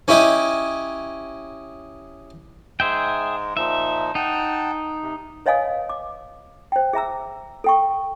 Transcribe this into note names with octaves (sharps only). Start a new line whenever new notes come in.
C#4 E4 G4 D#5
G#2 G#3 G#4 E5 G5
A#2 F3 D#4 E5
D#4 F#5 G5 A5
C3
B4 C#5 D#5 F5 G#5 D#6
D6
C5 G5
G#4 E5 A#5 E6
A4 G5 C#6